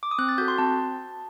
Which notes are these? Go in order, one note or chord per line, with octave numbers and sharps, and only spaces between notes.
D6
D#6
C4 F#6
A6
F#4 A4 G6
C6
C4 A5